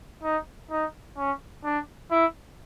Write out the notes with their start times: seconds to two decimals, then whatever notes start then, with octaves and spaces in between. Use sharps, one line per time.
0.23 D#4
0.71 D#4
1.18 C#4
1.65 D4
2.11 E4